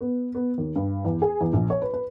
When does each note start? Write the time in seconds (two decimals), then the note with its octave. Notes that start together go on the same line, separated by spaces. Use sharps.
0.01 B3
0.35 B3
0.58 D#2
0.76 G2
1.05 E2
1.22 G#4
1.41 E2
1.53 A#1
1.70 C#5
1.82 B4
1.94 B4